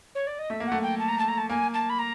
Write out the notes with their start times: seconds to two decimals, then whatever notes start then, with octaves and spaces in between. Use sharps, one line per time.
0.15 C#5
0.27 D5
0.39 D#5
0.50 A3 E5
0.60 A#3
0.67 F#5
0.72 A3
0.83 G5
0.99 A5
1.09 A#5
1.19 A5
1.28 A#5
1.38 A5
1.50 A#3 G#5
1.74 A5
1.89 B5
1.99 A#5